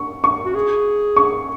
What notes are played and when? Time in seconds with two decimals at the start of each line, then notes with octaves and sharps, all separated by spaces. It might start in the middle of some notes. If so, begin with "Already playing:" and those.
Already playing: C#6
0.24 C#6
0.45 F#4
0.54 G#4
1.16 C#6